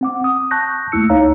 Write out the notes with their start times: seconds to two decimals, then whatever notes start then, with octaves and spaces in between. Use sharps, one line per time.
0.01 C4 F#5 D6
0.24 D#6
0.51 A5 C#6 F#6 G6 A#6
0.92 D#2 A3 A#3 E4 E6 C#7
1.10 C#2 D#4 C#5 F5 A#5